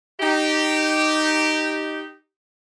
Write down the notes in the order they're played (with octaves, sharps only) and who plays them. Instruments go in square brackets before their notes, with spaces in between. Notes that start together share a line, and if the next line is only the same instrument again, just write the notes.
[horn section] D#4 G4